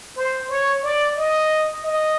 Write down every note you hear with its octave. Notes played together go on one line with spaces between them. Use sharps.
C5
C#5
D5
D#5
D#5